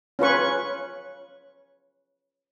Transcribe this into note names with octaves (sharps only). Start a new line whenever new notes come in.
C#4 F4 B4 C#6